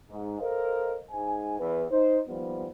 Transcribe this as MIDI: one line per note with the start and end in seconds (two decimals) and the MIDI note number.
0.11 0.38 44
0.40 0.98 69
0.40 0.98 70
0.40 0.98 72
0.40 0.98 75
0.40 0.98 77
1.10 1.56 44
1.10 1.56 80
1.60 1.83 40
1.60 1.83 71
1.90 2.18 63
1.90 2.18 72
2.27 2.67 39
2.27 2.67 53
2.27 2.67 55
2.27 2.67 59